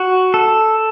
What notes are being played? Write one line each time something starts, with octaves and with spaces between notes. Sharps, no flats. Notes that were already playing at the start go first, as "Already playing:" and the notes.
Already playing: F#4
A4